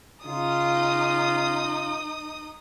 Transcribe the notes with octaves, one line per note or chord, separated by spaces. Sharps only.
C#3 C#4 D#4 F4 D#6